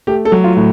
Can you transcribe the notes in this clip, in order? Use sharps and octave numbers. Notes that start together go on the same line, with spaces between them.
A3 G4
A4
F#3
F4
A2